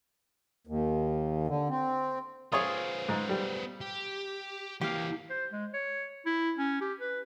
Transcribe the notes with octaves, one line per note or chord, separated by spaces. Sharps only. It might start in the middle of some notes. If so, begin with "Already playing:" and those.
D#2
D3
C4
B3 F4 G#4 C5 C#5 D#6
G#2
G3
G4
E3 A#3 G4 F5
C5
G#3
C#5
E4
C#4
G4
B4